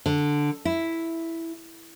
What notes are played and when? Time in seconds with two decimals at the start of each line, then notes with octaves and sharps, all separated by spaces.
0.06 D3
0.65 E4